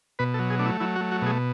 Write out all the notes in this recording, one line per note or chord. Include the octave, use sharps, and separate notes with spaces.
B2 B4
A4
F#3
G#4
A3 D4
E4
F#3 E4
F#4
A3
F#4
B2 G#4